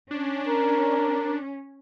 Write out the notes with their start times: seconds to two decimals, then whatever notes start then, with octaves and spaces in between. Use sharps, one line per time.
0.11 C#4 D4
0.47 A#4